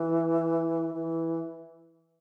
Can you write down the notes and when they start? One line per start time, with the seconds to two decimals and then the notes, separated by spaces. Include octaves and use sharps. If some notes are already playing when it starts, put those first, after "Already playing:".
Already playing: E3
0.94 E3